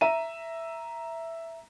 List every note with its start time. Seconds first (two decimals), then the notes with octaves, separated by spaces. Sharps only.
0.01 E5 A#5 D#7